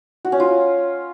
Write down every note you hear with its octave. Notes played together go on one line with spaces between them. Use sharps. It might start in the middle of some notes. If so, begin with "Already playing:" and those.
F#4
C#4
F4